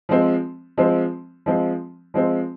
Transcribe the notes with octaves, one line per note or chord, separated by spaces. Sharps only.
F3 G#3 C4
F3 G#3 C4
F3 G#3 C4
F3 G#3 C4